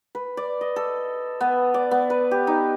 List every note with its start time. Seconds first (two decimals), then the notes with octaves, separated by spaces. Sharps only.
0.15 B4
0.37 D5
0.61 D#5
0.76 A4
1.41 B3
1.74 D5
1.91 B3
2.10 B4
2.31 G4
2.47 D#4